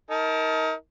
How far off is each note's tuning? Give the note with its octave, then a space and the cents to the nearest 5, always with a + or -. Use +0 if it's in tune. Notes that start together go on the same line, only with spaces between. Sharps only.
D#4 +35 A#4 +0 A5 -15